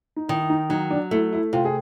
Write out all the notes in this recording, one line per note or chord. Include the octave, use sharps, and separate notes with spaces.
D#4
D#3 E4
E4
D#4
F#3 D#4
D4
A3 E4
E4
C3 F4
G#4